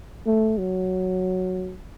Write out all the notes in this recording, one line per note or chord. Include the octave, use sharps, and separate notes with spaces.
A3
F#3